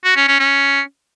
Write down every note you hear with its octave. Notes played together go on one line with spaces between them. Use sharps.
F#4
C#4
C#4
C#4